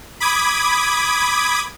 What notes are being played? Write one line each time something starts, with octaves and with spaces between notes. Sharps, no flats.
B5 D6 D#6 G#6